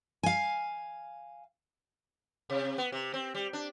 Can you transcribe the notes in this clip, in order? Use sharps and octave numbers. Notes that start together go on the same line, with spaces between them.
F5 G#5
C3
B3
C3
C4
G3
D4